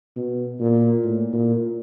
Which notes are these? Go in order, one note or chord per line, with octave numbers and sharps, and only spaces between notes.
B2
A#2
A2
A#2